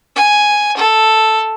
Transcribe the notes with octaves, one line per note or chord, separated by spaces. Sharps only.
G#5
A4